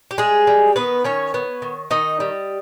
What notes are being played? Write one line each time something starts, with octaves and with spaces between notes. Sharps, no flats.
G4
G3 G#3 G#4
G3
D#3 B3 B4
D#3 C#4 C#5
B3
D#3
D#3 D#4 D#5
G3